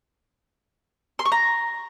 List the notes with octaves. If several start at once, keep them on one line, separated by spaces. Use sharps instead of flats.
C6
C#6
A#5